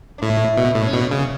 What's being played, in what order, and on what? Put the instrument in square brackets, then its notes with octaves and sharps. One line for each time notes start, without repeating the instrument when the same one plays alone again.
[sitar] D4
[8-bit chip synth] A2 [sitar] E4
[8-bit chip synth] B2
A2
[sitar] C#4
[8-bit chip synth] B2 [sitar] D4
[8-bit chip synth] C#3